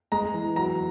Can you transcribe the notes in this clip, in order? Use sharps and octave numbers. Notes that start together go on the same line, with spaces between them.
G#3 A#5
E3
F#3 A#5